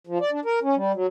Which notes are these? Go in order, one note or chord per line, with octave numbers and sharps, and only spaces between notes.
F3
D5
D4
A#4
C#4
G3
F#3